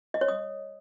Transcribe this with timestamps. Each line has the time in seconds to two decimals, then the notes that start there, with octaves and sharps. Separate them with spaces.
0.14 D#5
0.21 C#5
0.28 D#6